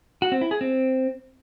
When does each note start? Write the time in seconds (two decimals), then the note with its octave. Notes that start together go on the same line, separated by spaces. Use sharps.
0.22 F#4
0.32 C4
0.41 E4
0.51 G#4
0.61 C4